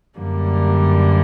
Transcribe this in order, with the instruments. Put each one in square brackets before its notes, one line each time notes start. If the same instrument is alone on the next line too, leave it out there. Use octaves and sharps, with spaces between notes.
[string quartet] F#2 D3 G3 A#3